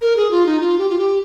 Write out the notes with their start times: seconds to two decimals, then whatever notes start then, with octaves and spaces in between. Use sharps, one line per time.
0.01 A#4
0.16 G#4
0.31 F4
0.46 D#4
0.60 F4
0.78 G4
0.89 F4
0.98 G4